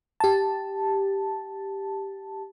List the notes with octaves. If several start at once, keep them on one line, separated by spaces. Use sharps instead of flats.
G4 A5